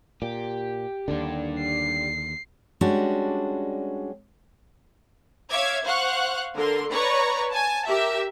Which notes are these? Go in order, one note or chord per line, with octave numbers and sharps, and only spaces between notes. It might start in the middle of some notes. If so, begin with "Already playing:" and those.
A#2 G4
D#2 D3 D4 G4
C7
G3 G#3 C#4 D4 F#4
C#5 E5 F5 D6 G#6
C5 F5 F#5 C#6 F#6
D3 A#4 C6
B4 C#5 D5 A#5 C#6
G#5 A5
G4 A#4 E5